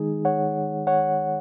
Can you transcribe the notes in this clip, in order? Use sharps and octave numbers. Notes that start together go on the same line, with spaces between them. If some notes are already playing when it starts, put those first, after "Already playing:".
Already playing: D#3 G#3 D#4 G#4
C#5 F#5
C#5 F#5